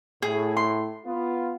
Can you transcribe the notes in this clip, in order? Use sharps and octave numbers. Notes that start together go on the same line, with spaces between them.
A2 G#4
C6
B3 F4